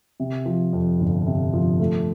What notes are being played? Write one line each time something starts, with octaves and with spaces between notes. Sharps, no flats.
C3
F3
F2
G1
C3
F3
A3